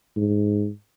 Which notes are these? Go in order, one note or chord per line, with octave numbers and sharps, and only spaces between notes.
G#2